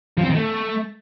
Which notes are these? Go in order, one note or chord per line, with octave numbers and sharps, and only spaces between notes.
F3
C4
D#3
A3